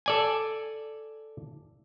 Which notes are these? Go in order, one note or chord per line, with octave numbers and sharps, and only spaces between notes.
A4 D5 G#5